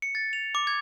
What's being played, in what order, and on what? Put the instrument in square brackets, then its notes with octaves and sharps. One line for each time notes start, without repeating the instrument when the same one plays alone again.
[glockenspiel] C#7
A6
F7
D6
G#6